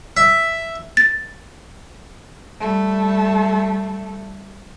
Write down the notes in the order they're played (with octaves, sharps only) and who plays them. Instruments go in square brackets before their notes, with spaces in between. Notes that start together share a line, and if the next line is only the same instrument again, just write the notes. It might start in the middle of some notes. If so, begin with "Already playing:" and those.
[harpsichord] E5
[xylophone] A6
[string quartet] G3 A3